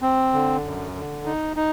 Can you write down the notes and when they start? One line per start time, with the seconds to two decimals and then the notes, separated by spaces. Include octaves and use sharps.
0.02 C4
0.33 D3
0.64 F#2
0.95 D3
1.25 D#4
1.56 D#4